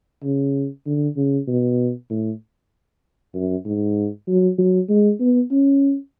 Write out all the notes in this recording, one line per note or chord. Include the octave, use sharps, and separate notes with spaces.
C#3
D3
C#3
B2
A2
F#2
G#2
F#3
F#3
G#3
B3
C#4